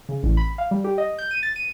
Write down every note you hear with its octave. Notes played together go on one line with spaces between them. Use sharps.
C#3
A1
B5
F5
G3
G4
D#5
G6
D#7
A6
D#7